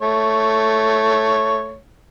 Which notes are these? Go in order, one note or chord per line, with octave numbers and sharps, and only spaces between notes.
A3 C#5